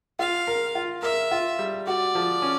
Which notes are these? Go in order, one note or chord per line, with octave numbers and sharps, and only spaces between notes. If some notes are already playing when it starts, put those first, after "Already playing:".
F4 F5
A#4
F4
A#4 E5
F4
G3
F#4 D5
F3
C#4